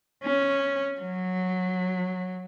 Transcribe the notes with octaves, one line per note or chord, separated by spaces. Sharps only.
C#4
F#3